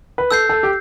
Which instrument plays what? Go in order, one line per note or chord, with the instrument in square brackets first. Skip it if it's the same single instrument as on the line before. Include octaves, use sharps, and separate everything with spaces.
[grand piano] B4
[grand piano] A4 [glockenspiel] E6 G6 C7
[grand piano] A4
G4